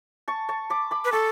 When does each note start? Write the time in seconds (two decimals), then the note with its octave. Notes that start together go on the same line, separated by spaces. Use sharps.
0.28 A5 C#6
0.49 A5 C#6
0.70 B5 D6
0.91 B5 D6
1.05 B4
1.12 A4 A5 C#6